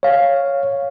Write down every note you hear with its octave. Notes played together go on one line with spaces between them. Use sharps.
C#5 F5